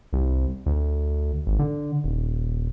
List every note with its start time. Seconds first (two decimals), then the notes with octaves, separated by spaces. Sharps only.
0.13 C2
0.66 D2
1.47 G#1
1.59 D3
2.04 D#1